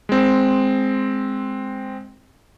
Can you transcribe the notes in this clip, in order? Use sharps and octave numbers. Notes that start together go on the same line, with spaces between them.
G#3 C4